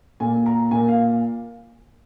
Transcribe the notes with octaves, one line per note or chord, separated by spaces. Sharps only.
A#2 A#3 G#5
A#5
A#2 A#3 G#5
F5